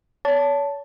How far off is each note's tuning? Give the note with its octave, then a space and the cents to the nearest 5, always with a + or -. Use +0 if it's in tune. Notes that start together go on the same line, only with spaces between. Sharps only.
C#5 +35 A5 +0